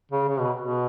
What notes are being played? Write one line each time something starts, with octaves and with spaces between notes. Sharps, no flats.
C#3
C#3
B2
B2